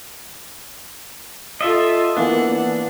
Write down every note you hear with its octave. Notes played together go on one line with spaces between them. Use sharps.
F4 A4 D#5 E5
E3 A#3 B3 D4 F#5